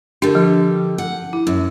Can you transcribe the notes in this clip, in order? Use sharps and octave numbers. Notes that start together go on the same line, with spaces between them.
D3 D4 G4 A#4
F3
F#5
E4
F#2